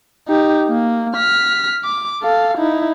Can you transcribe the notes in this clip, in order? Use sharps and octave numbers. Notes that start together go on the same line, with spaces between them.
D#4 G4
A#3
F6 B6
D6
A4 F5
D#4 E4